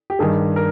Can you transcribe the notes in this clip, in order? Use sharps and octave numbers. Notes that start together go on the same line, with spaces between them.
G4
G2 D#3 G#4
A#4